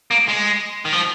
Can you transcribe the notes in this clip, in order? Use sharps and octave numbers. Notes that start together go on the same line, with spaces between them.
A#3
G#3
D#3
F3